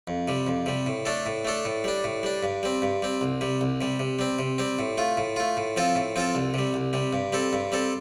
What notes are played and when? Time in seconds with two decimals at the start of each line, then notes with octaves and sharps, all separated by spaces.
0.07 F2
0.28 C3 G3
0.47 F2
0.66 C3 G3
0.86 A2
1.05 A3 D4 A4
1.26 A2
1.45 A3 D4 A4
1.65 A2
1.84 G3 D4
2.04 A2
2.23 G3 D4
2.43 G2
2.63 G3 C4
2.82 G2
3.02 G3 C4
3.21 C2
3.41 C3 G3
3.61 C2
3.81 C3 G3
4.00 C3
4.19 G3 C4
4.39 C3
4.58 G3 C4
4.79 A2
4.98 A3 F4
5.17 A2
5.36 A3 F4
5.57 A2
5.76 F3 C4 F4 A4
5.95 A2
6.16 F3 C4 F4 A4
6.35 C2
6.54 C3 G3
6.74 C2
6.93 C3 G3
7.13 G2
7.33 G3 C4 A4
7.53 G2
7.72 G3 C4 A4